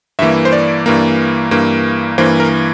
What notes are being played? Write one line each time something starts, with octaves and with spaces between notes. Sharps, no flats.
G2 E3 A#3 E5
C5
D5
G2 E3 A#3
G2 E3 A#3
G2 E3 A#3 C5
A#4